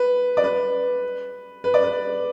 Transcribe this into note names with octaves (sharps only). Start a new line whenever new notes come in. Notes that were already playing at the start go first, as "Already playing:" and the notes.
Already playing: B4
D5
B4
B4
D5
B4